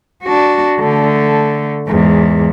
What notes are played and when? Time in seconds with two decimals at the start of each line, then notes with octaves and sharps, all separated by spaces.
0.24 D4 F#4
0.80 D3 A3
1.88 E2 G#2